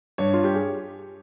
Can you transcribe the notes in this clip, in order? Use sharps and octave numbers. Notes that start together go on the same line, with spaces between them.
G2 C#5
F4
G4
G#4